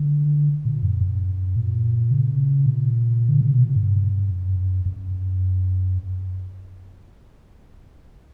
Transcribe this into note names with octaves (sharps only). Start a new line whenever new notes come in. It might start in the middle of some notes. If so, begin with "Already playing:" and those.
Already playing: D3
A#2
F#2
F#2
A#2
C#3
A#2
D3
C#3
B2
A#2
G2
F#2
F#2